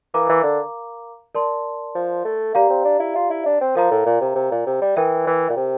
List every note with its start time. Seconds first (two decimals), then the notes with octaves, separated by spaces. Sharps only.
0.14 E3 A#4 F5 A#5 D6
0.29 E3
0.43 D3
1.34 A#4 D5 A5 C6
1.95 F3
2.25 A3
2.54 A#3 G4 D5 F5 A#5
2.70 C4
2.85 D4
3.00 E4
3.16 F4
3.30 E4
3.46 D4
3.61 C4
3.75 F3 A#4 F5 A#5
3.91 A2
4.06 A#2
4.21 C3
4.35 C3
4.51 A#2
4.66 C3
4.81 G3
4.96 E3 A#4 E5 G5
5.27 E3
5.49 A#2
5.56 C3